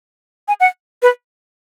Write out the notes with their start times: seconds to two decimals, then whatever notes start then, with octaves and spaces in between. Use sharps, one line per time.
0.48 G#5
0.60 F#5
1.02 B4